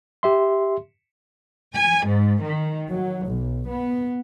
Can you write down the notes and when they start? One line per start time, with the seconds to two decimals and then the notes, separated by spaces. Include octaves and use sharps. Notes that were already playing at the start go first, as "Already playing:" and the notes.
0.23 G4 E5 C6
1.74 G#5
2.05 G#2
2.41 D#3
2.91 F#3
3.27 B1
3.69 B3